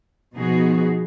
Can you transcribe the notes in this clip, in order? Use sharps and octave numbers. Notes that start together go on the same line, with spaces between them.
B2 F3 B3 D#4 F#4 G#4